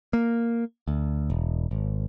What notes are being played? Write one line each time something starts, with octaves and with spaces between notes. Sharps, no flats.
A#3
D2
E1
G#1